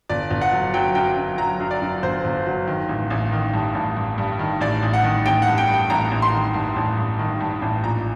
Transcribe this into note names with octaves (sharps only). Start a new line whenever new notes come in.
G1 D5
G1
F#5
F#3
F#3 G5
F#2 G5
F#2
F#3 A#5
F#2
D5
F#2
G1 C5
G1
F#3
D#3
A1
A1
D#3
G2
A1
G2
G2
D#3
A1 D5
A1
F#5
D#3
A1 G5
F#5
G2
G5
G2
G5
A1 A#5
A1
C6
D#3
G2
A1
G2
D#3
G2
A1
A#1 A#5